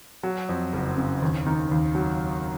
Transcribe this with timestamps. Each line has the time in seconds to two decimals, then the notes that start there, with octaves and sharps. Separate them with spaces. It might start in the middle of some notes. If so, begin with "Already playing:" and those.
0.23 F#3
0.49 F2
0.73 F#1
0.97 C#3
1.22 D#2
1.46 D#3
1.71 D#2
1.95 F#3